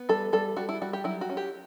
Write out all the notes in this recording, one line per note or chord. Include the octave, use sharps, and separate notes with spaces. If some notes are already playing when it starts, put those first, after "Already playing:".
Already playing: B3
G3 A4
G3 A4
G3 F#4
E4
G3 F#4
G4
F#3 E4
F#4
C#4
G4